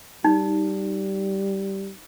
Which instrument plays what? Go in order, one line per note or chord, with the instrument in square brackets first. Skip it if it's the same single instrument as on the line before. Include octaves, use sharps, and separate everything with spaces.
[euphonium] G3 [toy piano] D#4